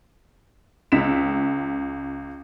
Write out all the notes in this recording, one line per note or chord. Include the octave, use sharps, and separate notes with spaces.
C#2 B6 E7